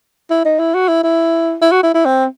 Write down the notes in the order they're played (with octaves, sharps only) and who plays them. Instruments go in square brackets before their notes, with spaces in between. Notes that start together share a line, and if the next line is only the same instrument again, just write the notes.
[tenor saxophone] E4
D#4
E4
F#4
E4
E4
E4
F#4
E4
E4
C4